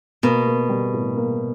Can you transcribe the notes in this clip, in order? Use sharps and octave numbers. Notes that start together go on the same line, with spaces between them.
B2 A#3
A#3
G3
A2
A#3